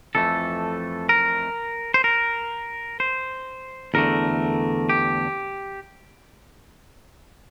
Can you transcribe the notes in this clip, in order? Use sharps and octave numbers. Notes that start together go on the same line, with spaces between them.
F2 E3 A3 A4
A#4
C5
A#4
C5
E2 D3 A3 A#4
G4